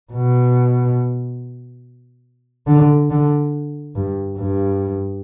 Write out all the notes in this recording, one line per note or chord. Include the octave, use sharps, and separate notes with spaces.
B2
D3
D3
G2
G2